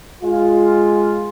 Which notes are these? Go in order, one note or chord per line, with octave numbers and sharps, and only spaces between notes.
G#3 F4